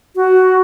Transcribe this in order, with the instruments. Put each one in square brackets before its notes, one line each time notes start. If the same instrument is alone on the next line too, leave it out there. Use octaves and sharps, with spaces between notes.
[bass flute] F#4